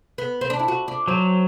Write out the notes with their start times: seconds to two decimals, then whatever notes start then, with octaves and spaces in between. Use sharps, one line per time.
0.18 B3
0.41 C4
0.50 D4
0.59 E4
0.68 F#4
0.88 D4
1.08 F#3 C4